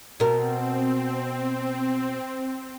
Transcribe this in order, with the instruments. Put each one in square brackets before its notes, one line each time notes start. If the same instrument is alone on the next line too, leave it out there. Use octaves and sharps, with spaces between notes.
[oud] B2 A#4 [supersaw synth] C4